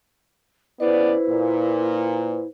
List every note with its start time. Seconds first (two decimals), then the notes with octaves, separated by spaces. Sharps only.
0.80 C#3 B3 E4 B4 C5 D5
1.28 A#2